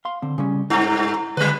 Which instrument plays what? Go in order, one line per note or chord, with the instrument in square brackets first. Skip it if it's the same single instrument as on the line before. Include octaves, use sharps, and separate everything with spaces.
[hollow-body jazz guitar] F5 C6
D3 C4
C#3 G3 C#4
[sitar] G2 [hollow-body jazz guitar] E4
[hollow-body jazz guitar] D3 G#3 [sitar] F#3 B4